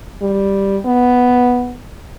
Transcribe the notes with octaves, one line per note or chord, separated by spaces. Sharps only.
G3
B3